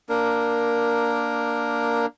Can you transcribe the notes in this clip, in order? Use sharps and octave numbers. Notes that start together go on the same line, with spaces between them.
A#3 D4 A#4